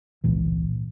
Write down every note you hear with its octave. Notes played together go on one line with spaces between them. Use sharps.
G#1 C#2 A#2 E3